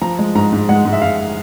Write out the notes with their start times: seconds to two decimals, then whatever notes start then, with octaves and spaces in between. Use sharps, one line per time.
0.02 F3 A#5
0.19 G#3
0.35 G#2 A#5
0.53 G#2
0.69 G#3 F#5
0.85 G#2
0.93 E5
1.02 G#2 F5